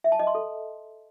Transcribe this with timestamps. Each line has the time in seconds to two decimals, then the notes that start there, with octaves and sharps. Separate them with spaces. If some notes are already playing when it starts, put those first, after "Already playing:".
0.04 E5
0.12 A5
0.19 D#5
0.27 C6
0.35 A4